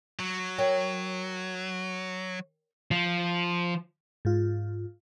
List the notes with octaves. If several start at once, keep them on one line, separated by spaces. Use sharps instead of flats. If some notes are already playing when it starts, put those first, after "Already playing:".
F#3
A#4 C#5 G5
F3
G#2 F4